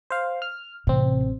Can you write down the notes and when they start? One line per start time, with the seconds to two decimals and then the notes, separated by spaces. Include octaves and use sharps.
0.10 C5 F5
0.42 F6
0.87 A1 C3 C4